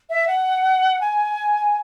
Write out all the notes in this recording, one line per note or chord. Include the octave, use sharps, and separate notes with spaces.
E5
F#5
G#5